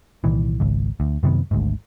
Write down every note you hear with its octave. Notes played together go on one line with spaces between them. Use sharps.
C2 A#2 D#3 E3
G#1 C#2
D2
F#2 C3 D#3 B3
G#1 D2 G#2